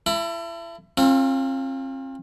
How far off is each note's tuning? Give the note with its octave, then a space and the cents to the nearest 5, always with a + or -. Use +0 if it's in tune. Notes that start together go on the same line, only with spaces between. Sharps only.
E4 +35 A4 +35 B5 +0
C4 +40 F4 +0 A4 +45